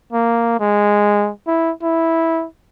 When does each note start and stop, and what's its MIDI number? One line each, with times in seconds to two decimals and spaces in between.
0.13 0.55 58
0.60 1.30 56
1.47 1.71 64
1.83 2.45 64